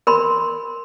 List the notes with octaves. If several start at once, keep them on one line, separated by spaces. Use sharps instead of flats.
A#4 B5 C6